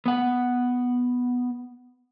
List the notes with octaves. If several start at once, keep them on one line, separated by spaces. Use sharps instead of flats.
B3 F#5